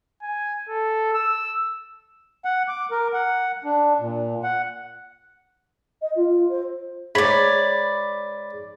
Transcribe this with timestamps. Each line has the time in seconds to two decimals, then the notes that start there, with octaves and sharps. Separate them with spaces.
0.23 G#5
0.69 A4
1.14 E6
2.45 F#5
2.68 D6
2.91 A#4
3.13 F#5
3.64 D4
3.99 A#2
4.44 F#5
6.02 D#5
6.16 F4
6.49 C5
7.15 G#2 C#5 D5 B5